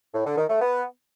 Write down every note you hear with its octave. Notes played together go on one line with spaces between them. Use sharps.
A2
D3
D#3
A3
B3